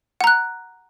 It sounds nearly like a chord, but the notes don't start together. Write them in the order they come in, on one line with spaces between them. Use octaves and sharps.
F#5 A#5 F#6